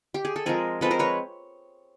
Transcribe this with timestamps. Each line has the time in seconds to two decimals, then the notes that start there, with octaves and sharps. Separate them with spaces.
0.14 G4
0.25 G#4
0.36 A4
0.46 F3 G#3 C4 G#4 A#4
0.81 F3 G#3 C4 A4 B4
0.91 A#4 C5
0.99 B4 C#5